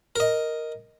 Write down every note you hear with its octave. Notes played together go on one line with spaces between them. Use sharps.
A#4 D#5